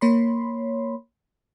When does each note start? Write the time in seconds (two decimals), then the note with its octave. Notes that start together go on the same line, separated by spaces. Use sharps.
0.01 A#3 C#5 B5 C6